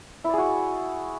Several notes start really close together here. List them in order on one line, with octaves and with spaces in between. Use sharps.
E4 D5 G#4 F#4